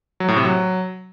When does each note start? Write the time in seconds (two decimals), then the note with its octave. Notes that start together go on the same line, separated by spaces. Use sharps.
0.20 F#3
0.28 A2
0.37 C3
0.45 F#3